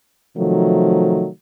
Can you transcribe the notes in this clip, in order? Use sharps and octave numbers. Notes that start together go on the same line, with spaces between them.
C3 D#3 F3 F#3 A3